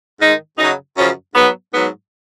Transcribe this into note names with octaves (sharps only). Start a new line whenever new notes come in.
G#2 D#3 G#3 D#4
F#2 C#3 F#3 D#4
F#2 C#3 F3 C#4
G#2 F#3 B3
G#2 F#3 B3